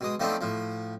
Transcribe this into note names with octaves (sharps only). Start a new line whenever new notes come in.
B2 G#3 D#6
D#3 F3 A3 B3 C4 D4
A2 F3